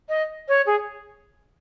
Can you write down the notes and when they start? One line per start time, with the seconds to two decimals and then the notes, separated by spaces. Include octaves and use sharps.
0.09 D#5
0.48 C#5
0.67 G#4